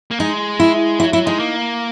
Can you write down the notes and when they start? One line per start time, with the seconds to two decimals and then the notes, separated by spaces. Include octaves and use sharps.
0.11 A#3
0.20 G#3 D#4
0.60 E4
0.99 F#3 E4
1.13 F#3 E4
1.26 G#3 D#4
1.39 A#3